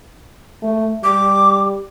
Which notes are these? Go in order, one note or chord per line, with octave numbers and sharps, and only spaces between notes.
A3
G3 D6